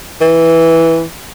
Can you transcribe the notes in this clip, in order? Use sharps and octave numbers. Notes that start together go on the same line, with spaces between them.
E3